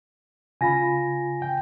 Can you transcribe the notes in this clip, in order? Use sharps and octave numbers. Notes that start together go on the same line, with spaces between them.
C#3 F4 G#5 B5 A#6
G5